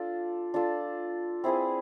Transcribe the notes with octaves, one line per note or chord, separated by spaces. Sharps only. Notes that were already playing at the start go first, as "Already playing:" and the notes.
Already playing: D4 F4 A4 D5
D4 F4 A4 D5
C4 E4 G#4 B4